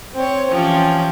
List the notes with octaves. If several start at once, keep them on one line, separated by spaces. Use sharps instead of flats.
C4 C#5
E3 F3 C#4 G4